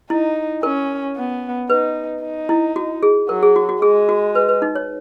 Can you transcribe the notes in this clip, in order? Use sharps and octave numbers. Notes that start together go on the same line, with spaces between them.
D#4 E4
C#4 A#4
B3
D#4 B4
D#4
E4
F#4
G#4
F#3 A#4
G#4
F#4
F#4
G#3 G#4
F#4
B4
B4
D#4
C#5